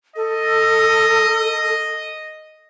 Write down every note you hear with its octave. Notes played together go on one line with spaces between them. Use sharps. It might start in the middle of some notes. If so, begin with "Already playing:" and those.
A4 D#5